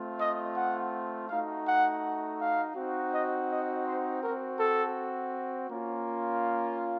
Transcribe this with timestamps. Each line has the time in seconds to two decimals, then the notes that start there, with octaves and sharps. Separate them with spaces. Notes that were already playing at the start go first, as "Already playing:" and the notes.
Already playing: A3 C4 F4
0.20 D#5
0.56 F#5
1.29 A3 D#4 F#4 F5
1.66 F#5
2.40 F5
2.76 C4 D#4 F#4
3.13 D#5
3.50 D#5
3.86 C5
4.23 C4 F#4 A#4
4.60 A4
5.70 A#3 C#4 F4